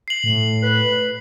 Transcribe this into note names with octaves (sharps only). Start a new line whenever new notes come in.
C7 F#7
A2
B4